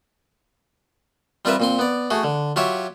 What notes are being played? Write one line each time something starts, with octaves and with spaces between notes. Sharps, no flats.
G3 C4 F4 A#4 B4 E5
A#2 C4 C6
B3 D5
A3 F#4 G#4
D3
F#3 F4 G4 C#5 E5